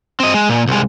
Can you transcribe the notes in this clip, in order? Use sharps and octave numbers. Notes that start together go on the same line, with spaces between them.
C4 D#5
G#3
A#2
C2 G#3